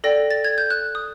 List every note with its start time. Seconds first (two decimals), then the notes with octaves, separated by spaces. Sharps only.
0.04 A4 D5 G5 A#6
0.31 A6
0.45 G#6
0.58 G6
0.70 F#6
0.95 D#6